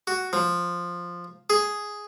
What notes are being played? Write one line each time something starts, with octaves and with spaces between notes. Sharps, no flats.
F#4
F3
G#4